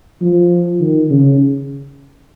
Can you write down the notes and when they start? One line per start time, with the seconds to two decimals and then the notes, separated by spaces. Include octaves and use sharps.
0.21 F3
0.80 D#3
1.10 C#3